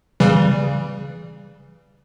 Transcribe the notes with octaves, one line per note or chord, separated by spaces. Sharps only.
C#3 E3 G3